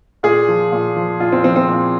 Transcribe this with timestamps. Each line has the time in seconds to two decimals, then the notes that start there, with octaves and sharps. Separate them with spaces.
0.23 A#2 G#4
0.48 F3
0.72 A#2
0.96 F3
1.20 A#2 F4
1.32 C4
1.44 F3 C4
1.56 C4
1.68 A#2